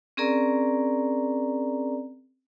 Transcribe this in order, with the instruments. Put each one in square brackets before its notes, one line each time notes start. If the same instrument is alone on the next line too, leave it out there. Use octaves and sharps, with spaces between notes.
[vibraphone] C4 C#4 G#4 A#4 D5 A#5